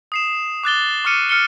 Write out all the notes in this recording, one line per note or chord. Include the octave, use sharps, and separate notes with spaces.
D#6 C7 E7
D6 F#6 A6 G7
C#6 D6 F6 C#7 D#7
F6 C#7 G7